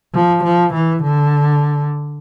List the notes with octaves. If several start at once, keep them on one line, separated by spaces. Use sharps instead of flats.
F3
F3
E3
D3